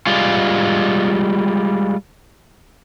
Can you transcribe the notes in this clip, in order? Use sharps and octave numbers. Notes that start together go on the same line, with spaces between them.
G3 G#3 F4